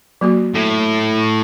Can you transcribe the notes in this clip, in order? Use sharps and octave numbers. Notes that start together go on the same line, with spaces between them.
F#3 A#3 F#4
A2